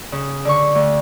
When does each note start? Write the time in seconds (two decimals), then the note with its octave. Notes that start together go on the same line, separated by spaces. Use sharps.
0.12 C#3
0.45 D3 C#6
0.75 D2